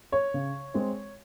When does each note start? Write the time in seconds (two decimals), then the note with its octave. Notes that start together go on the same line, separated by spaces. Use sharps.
0.12 C#5
0.34 C#3
0.74 G#3 C4